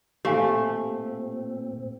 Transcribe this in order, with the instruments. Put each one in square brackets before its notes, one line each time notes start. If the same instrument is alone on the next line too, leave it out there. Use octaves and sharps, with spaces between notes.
[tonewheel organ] A#2 C4 [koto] A3 [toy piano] G4 F5 G#5